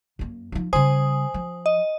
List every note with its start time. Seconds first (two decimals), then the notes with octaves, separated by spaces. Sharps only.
0.19 F#2 A#3
0.52 F3 D#4
0.73 C#3 G3 C5 G#5 D#6
1.34 F3
1.66 D#5